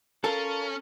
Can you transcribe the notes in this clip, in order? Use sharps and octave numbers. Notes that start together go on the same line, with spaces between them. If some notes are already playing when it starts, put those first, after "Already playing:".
C#4 F4 A4 A#4 A5